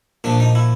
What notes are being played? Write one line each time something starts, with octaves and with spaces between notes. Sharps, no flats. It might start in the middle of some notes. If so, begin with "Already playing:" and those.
A#2 F3 D4
D#4
E4